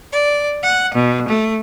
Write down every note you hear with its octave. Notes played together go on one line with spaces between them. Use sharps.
D5
F#5
B2
A3